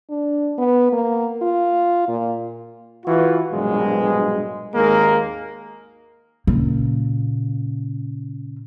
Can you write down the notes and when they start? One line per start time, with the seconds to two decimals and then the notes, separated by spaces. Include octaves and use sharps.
0.10 D4
0.58 B3
0.93 A#3
1.42 F4
2.08 A#2
3.06 E3 F4 F#4
3.52 A#1 G2 B2 F#3 G#3
4.74 G#1 D#2 G#3 A#3 G#4 A#4
6.47 A#2 C#3